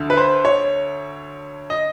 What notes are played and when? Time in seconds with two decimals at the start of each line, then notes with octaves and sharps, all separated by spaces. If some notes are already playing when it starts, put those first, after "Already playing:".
Already playing: D2 D3
0.10 B4
0.17 C5
0.45 C#5
1.70 D#5